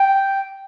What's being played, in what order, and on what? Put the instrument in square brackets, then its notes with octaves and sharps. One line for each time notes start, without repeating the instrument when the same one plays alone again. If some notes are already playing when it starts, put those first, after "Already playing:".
Already playing: [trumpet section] G5